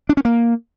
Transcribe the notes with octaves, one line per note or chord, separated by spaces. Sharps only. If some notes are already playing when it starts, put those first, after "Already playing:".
D4
C#4
A#3